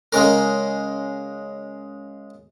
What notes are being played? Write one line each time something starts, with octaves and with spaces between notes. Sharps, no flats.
C#3 G#3 C#4 A#4